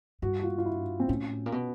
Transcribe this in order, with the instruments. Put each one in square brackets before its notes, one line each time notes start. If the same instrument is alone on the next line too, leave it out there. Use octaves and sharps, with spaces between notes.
[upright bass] G2 [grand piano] F#4
[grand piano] F#4
F4
F4
E4
C4
[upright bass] A2 [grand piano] C#4
[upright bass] A#2
B2